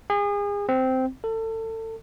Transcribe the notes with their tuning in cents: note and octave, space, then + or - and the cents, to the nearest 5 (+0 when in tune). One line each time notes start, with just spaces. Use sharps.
G#4 -35
C4 -10
A4 +30